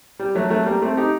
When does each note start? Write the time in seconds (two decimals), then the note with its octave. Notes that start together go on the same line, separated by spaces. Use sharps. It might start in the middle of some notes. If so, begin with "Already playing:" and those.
0.19 G3
0.35 F#3 A3
0.50 F#3 A3
0.66 G3 A#3
0.82 A3 C4
0.97 D#4 G4